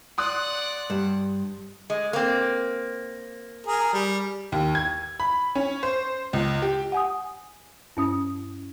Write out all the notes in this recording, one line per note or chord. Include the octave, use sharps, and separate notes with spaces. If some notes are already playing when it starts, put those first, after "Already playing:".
D5 F#5 C6 D#6 F#6
G2
G#3
A#3 C4
G#4 A#4
G3
D#2
G#6
B5
C#4
C5
C#2
G4
F#5 G#5 D#6
G2 C#4 D#6